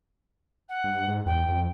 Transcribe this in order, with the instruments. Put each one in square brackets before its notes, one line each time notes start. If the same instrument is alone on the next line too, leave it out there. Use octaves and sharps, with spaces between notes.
[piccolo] F#5
[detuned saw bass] G2
G#2
[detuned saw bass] E2 [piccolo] G5
[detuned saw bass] F2